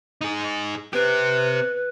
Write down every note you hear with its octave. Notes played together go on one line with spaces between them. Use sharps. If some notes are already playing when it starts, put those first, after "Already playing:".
D#4 G#4
C4 G4 B4